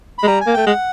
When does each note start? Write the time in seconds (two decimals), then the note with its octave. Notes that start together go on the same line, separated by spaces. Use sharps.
0.18 B5
0.23 G#3
0.27 G3 A#5
0.41 G#5
0.47 A#3
0.54 A3 G5
0.66 G#3 F#5